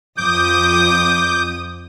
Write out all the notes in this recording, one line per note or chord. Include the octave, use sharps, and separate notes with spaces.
F2 D6 D#6 G6